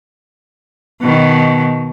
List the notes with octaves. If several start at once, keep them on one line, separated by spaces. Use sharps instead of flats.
B2 D#3